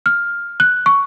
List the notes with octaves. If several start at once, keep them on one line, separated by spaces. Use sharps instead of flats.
F6
F#6
C#6